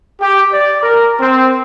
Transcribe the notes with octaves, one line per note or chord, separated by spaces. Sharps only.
G4
D5
A#4
C4